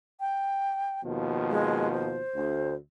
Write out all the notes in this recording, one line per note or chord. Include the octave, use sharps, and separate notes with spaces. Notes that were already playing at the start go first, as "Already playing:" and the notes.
G5
D#2 B2 F3
G#3
C5
D2